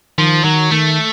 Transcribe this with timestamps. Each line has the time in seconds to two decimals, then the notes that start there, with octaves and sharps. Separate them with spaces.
0.18 D#3 F3
0.44 D#3 F#3
0.71 D#3 A3